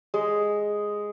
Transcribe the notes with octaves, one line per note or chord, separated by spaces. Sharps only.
G#3